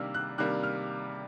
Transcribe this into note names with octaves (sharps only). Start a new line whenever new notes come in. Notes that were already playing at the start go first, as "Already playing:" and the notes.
Already playing: C3 D#3 G3 A#3 D4 E6 F6
F#6
C3 D#3 G3 A#3 D4 F#6
F6